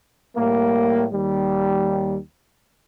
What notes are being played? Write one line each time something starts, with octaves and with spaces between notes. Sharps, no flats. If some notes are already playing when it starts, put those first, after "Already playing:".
A2 G3 A#3
D#2 G3